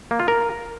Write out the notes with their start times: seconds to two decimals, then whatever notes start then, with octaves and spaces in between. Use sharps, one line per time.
0.11 A#3
0.19 F4
0.28 A#4